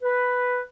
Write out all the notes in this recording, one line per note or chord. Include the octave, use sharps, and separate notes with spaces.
B4